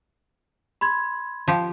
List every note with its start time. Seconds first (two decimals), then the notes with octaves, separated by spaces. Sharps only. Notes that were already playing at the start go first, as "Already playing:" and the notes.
0.81 B5 C6 G#6
1.48 F3 G4